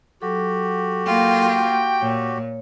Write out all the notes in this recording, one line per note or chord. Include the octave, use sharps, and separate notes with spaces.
F#3 F#4 G4 A4
A#3 F4 G5
A#2 C#5